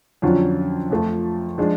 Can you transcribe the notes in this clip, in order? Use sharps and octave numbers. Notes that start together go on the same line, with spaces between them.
F2 D3 F#3 C#4 F4
F2 F3 A3 F4
F3 G#3 D4 F4